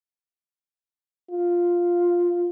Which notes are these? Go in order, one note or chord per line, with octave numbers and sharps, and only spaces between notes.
F4